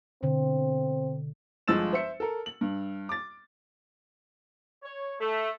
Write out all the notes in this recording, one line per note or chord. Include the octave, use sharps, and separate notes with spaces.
B2 D3 C4
G1 F3 G#3 E6 A6 E7
C5 E5 C#7
A4 A#4
F#7
G2
D6 A6
C#5
A3